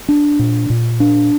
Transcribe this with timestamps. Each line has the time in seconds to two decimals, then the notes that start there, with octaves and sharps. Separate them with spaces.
0.09 D4
0.39 A#2
0.70 A#2
1.00 D4